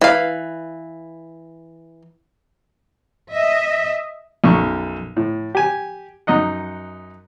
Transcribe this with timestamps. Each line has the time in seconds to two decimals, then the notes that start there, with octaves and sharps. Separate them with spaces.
0.01 E3 F5
3.32 D#5 E5
4.44 B1 F#2 C#6
5.17 A2
5.55 G4 G#5
6.27 F#2 D#4 D#5 F#5